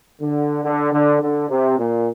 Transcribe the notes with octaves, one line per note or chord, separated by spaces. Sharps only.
D3
D3
D3
D3
C3
A#2